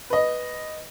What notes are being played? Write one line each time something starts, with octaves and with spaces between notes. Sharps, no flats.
B4 D#5